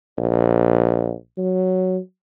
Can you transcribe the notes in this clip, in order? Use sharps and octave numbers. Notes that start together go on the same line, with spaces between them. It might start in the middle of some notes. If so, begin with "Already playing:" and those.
A#1
F#3